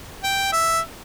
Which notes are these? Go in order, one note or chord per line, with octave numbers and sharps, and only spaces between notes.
G5
E5